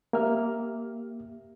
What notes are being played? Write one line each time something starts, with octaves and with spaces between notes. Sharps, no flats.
A#3 G4 E5 F6